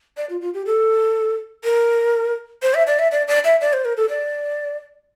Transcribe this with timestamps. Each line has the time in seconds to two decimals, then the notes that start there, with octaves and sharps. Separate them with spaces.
0.17 D5
0.30 F4
0.41 F4
0.54 G4
0.66 A4
1.64 A#4
2.62 C5
2.74 E5
2.87 D5
2.99 E5
3.12 D5
3.28 D5
3.44 E5
3.61 D5
3.73 C5
3.85 A#4
3.97 A4
4.09 D5